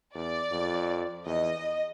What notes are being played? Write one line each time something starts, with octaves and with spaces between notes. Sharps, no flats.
E2 D5
F2
E2 D#5